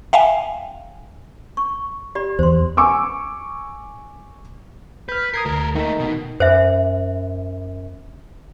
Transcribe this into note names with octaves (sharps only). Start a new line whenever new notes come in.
E5 F5 G5 G#5
C#6
G4 D5 B5
E2 C5 C6
G#5 C#6 D6 E6
B4 F6 G6
A#4 D#6 G#6 C7
D2 A4 A#4
D#3 A3 A#3 D#4
B2
F#2 C5 E5